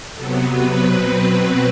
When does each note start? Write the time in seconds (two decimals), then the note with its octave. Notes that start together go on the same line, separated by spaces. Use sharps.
0.15 C3 F#3 B3 A4
0.48 B4
0.80 B2 F#3 C4 B4